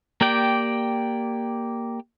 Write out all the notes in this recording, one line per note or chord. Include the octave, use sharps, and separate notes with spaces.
A#3 G4 D5 G5